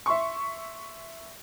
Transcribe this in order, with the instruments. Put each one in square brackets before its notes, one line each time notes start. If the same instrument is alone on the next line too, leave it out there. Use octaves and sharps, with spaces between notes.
[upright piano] E5 C6 C#6